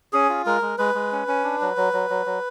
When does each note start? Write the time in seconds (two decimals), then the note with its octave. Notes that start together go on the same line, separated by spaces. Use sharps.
0.13 C#4 G#4
0.29 F4
0.46 G#3 A#4
0.62 G#3
0.78 G#3 B4
0.95 G#3
1.12 C#4
1.28 C#4
1.44 D4
1.61 F#3
1.77 F#3
1.93 F#3
2.10 F#3
2.26 F#3